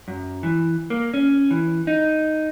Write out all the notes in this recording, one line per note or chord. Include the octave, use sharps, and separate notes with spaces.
F#2
E3
A#3
C#4
E3
D#4